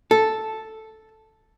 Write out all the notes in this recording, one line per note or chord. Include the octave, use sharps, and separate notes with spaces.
A4